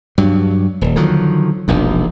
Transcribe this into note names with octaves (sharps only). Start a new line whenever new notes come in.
G2 F#3
D#1
D3 D#3 F3 F#3
E1 A#1 D#2